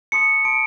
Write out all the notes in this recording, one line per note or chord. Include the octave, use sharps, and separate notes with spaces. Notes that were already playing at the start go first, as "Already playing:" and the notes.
A5 C6 D#6 C#7
A5 C6 D#6 D7